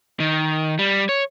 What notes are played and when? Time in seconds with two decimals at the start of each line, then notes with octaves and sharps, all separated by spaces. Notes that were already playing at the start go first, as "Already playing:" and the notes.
0.20 D#3
0.79 G3
1.09 C#5